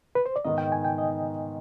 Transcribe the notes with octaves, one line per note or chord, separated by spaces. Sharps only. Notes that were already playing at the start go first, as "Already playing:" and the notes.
B4
C5
D5
G#2 D#3 B3 D#5
G5
G#5
G5
D#5